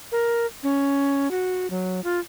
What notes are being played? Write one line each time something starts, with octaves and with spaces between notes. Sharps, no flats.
A#4
C#4
F#4
F#3
F4